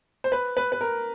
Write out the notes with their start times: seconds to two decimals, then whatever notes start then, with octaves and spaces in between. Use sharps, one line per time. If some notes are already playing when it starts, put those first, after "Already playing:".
0.24 C5
0.32 B4
0.57 B4
0.72 B4
0.81 A#4